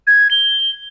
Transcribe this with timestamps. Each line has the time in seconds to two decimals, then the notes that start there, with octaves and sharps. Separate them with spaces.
0.07 G#6
0.31 G7